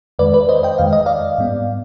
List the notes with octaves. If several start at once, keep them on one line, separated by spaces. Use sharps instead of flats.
F2 D#3 G#3 B4 D5
B4 D5
C5 D#5
D#5 G5
F2 D#3 G#3 F5
D#5
D5 F5
G#2 G3 B3